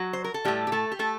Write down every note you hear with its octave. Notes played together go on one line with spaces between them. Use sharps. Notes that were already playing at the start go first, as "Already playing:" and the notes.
Already playing: F#3 F#4
C5
A#4
A4
A2 G3 A3 G4
G4
A3 A4
G4
A3 A4